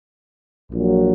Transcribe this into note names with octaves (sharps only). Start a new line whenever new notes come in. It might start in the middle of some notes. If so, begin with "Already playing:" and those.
A#1 A#2 F#3